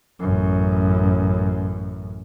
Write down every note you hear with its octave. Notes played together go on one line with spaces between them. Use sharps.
A1 F#2